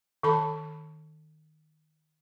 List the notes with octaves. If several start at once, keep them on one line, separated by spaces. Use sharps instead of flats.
D#3 A4 A5 B5